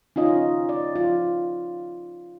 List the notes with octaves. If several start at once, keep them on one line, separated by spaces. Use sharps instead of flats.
C#4 D#4 F4 D#5
D5
F4